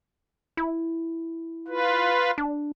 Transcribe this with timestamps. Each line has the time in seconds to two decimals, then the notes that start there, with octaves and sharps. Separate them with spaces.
0.57 E4
1.68 F4 B4
2.38 D4